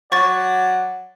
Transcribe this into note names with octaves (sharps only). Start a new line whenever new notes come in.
F#3 D5 F#5 C#6 A6